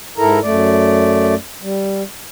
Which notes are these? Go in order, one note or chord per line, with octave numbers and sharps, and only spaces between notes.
G#2 E4 A4 A#4 A#5
F#2 A3 D5
G3